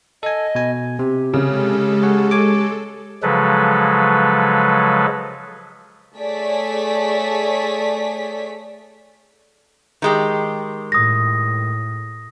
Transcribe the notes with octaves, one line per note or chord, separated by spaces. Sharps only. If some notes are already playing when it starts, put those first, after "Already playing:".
A4 D#5 G#5
B2 G#5
C3 G4
C#3 G#3 A4
G#4 C#5 F#5
C#5 G#5 D6
C#3 F3 F#3 G#3 A4 B4
A3 G#4 C#5 D5 B6
D#3 G#3 G4
A2 D#6 A#6